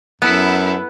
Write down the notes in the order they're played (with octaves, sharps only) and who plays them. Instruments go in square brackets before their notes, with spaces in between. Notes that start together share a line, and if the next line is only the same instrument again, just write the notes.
[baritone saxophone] F#2 [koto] B3 [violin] E4 A4